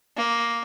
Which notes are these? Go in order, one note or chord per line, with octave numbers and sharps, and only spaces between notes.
A#3